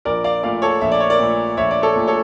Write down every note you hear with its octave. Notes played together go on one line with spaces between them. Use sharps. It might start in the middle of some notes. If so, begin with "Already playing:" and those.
A#1 A#4 D5
D5 F5
A#2 A3 D5 F5
A4 C#5
A#1 E5
D5
C#5
A#4 D5
A#2 A3
A#1 C#5 E5
D5
A4 C#5
A#2 A3
A4 C#5